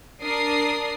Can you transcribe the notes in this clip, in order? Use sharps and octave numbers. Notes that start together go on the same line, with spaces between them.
D4 A#4 D5 D#6 C7